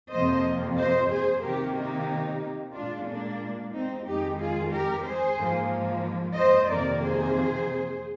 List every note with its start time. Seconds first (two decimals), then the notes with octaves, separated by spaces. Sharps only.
0.11 F2 C3 F3 A#3 C5 D#5
0.78 C5 D#5
1.11 G#4 C5
1.43 C3 D#3 A#3 G4 A#4
1.76 D#4 G4
2.74 A#2 G#3 D4 F4
3.08 A#3 D4
3.73 C4 D#4
4.06 F2 D#3 G#3 D#4 G4
4.39 F4 G#4
4.71 G4 A#4
5.04 G#4 C5
5.38 G#2 F3 A#3
6.36 C5 D#5
6.69 F2 C3 D#3 A#3 A#4 D5
7.02 G#4 C5